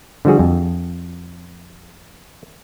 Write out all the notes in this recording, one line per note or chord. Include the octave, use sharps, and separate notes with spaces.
D3 F3 G3 F#4 G#4
F2